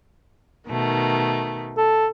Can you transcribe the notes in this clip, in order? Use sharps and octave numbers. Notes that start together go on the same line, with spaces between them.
B2 D#3 A3
A4